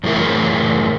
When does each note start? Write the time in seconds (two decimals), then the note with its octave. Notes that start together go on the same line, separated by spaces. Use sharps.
0.04 F#2 A2 E3 G#4 A#4 E5